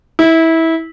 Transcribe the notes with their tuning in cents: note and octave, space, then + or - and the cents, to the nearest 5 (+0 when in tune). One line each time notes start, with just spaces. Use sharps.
E4 -20